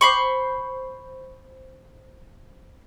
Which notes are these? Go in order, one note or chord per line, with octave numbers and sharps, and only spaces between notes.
C5 B5 C#6